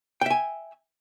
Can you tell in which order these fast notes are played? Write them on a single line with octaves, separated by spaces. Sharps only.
G5 E5 G#5